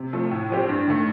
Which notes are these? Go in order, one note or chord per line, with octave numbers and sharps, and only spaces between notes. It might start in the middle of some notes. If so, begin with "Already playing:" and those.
Already playing: C3
F3 A3
A2
F3 C4 G4
G2
D#3 A3